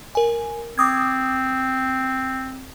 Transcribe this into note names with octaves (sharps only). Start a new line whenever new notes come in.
A#4 G#5
C4 D6 D#6 G#6